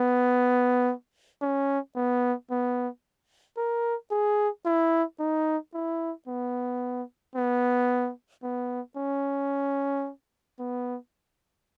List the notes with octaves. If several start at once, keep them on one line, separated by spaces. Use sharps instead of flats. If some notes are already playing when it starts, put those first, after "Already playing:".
Already playing: B3
C#4
B3
B3
A#4
G#4
E4
D#4
E4
B3
B3
B3
C#4
B3